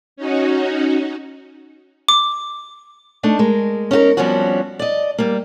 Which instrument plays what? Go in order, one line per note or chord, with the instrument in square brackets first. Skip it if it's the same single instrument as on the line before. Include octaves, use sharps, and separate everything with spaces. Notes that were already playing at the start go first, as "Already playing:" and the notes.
[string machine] C#4 D#4 F#4
[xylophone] D6
[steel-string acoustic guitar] A3 D4 D#4
G#3 A#4
C#4 D#4 F#4 A#4
F2 F3 G3 B3 C#4 F#4
D5 D#5
G3 A#3